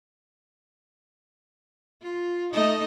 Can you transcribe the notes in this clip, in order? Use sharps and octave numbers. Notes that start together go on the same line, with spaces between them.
F4
A3 D#4 D#5